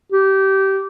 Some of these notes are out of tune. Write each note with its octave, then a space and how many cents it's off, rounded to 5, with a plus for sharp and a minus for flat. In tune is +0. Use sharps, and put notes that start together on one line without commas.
G4 -20